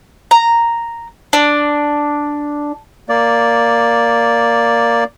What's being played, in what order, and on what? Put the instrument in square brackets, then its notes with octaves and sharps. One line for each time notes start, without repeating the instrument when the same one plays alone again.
[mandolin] A#5
D4
[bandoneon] A#3 D5